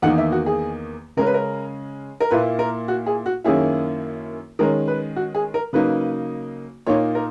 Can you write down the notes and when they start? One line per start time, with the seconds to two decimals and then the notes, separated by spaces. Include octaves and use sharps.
0.02 E2 D#3 A#3 D#4 F#5
0.18 E5
0.32 F#4
0.46 G#4
1.17 C#3 G#3 C#4 A#4
1.26 B4
1.34 A#4
2.20 A#4
2.31 A#2 A#3 E4 B4
2.59 A#4
2.88 F#4
3.06 G#4
3.26 F#4
3.44 F#2 D#3 A#3 C#4 E4 G#4
4.59 D#3 G#3 C#4 A#4
4.88 B4
5.16 F#4
5.35 G#4
5.54 A#4
5.73 C#3 F#3 A#3 D#4 B4
6.87 A#2 A#3 D#4 C#5
7.15 A#4